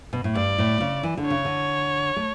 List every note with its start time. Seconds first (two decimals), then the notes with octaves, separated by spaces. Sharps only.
0.13 B2
0.24 A2
0.35 G2 D5
0.58 A2
0.80 C#3
1.03 E3
1.17 D3
1.26 C#3 C#5
1.45 D3
2.16 A3